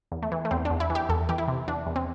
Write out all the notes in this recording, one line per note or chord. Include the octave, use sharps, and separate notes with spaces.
E2
A3
E3
A3
E2 C4
D4
E2
E4
E3
G4
E2 A4
E3 G4
E4
C3
E2 D4
E2
C4